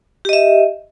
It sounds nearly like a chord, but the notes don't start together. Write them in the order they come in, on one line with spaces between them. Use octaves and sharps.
G4 D#5 E5